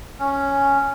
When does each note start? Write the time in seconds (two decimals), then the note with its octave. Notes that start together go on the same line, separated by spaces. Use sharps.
0.19 C#4